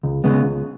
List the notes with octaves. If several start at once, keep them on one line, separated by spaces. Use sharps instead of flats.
C#2
C#3 G#3 B3
C#2